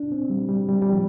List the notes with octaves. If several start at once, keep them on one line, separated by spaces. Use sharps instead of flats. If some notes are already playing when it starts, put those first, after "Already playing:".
Already playing: D4
C4
G3
G3
G3
G3
F3